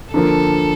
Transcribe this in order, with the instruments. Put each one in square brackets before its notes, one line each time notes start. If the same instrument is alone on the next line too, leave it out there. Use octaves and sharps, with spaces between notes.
[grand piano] D3 F3 A#3 [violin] A4